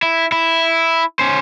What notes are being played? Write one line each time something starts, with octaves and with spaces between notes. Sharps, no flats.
E4
E4
C#4 C5